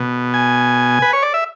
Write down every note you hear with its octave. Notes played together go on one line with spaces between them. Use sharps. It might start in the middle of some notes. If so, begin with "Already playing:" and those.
Already playing: B2
G#5
B4
C#5
D5
E5